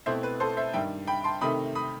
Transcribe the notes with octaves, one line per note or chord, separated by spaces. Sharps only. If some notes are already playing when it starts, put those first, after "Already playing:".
B2 A3 C4 E4 C5 E5
B4
A4 C5
C5 E5
G2 D#3 G3 E5 G5
G5 B5
A5 C6
C3 D#3 A3 B5 D#6
B5 D#6